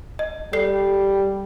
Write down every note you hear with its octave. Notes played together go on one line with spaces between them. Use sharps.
D#5
G3 A4 D5 C7